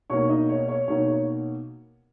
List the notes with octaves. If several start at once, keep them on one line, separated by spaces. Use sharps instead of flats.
B2 A#3 D#4 C#5 C#6
D#4 D#5
C#5
C#5
B2 A#3 D#4 C#5
C#5